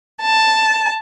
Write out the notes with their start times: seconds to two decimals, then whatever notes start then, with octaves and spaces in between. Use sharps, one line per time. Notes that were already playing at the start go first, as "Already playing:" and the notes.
0.20 A5